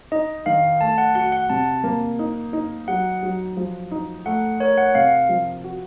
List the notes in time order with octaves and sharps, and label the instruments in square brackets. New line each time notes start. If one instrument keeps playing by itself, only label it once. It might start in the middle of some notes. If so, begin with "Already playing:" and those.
[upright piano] D#4 [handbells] D#5
[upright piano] D#3 [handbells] F5
[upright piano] A3 [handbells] A5
[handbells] F#5
[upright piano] F#4 [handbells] F#5
[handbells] F#5
[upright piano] C3 [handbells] A5
[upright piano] A#3
D#4
D#4
[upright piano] F#3 [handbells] F#5
[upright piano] F#3
F3
D#4
[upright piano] A3 [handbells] F#5
[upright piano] A#4 [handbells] C#5
[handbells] F#5
[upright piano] C3 [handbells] F5
[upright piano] F3
F#4